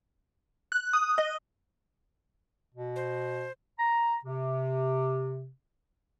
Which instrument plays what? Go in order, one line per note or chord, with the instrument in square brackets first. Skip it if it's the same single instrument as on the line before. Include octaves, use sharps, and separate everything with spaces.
[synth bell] F#6
D#6
D#5
[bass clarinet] B2
[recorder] C5
[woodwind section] A#5
C3